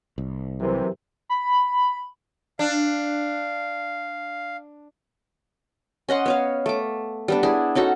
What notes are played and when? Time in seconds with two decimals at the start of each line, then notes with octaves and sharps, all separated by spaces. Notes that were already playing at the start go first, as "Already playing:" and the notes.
0.18 C2
0.60 C3 E3 F#3 A#4 C5
1.29 B5
2.59 D4 F5
6.09 C#4 D#5 F#5 C6
6.26 B3 C#5 F5
6.66 A3 D6
7.28 G3 B3 D4
7.43 D4 E4 G#4
7.75 C#4 D#4 F#4 A4